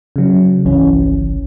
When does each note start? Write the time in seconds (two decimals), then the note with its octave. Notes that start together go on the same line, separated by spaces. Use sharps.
0.16 C#3 F#3
0.65 G1 C2 E3 C#4